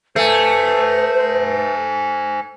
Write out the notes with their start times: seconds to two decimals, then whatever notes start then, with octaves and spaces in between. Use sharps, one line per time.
0.16 A3 B4 C5 G#5